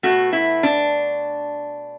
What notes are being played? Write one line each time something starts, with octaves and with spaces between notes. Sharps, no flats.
B2 A3 F#4
E4
D4